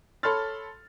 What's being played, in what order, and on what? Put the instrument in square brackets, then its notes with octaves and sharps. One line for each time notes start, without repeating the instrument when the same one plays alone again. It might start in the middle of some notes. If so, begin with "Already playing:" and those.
[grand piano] A4 C#5 B5 C6 F6 A6